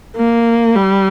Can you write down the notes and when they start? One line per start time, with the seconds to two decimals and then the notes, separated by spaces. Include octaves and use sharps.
0.16 A#3
0.76 G3